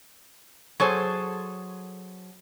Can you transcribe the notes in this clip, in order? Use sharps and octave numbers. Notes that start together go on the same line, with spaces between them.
F#3 G#4 A4 C5